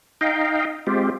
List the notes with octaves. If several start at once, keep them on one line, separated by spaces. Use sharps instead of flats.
D#4 D#5 F5 G5
G#3 C4 F4 G4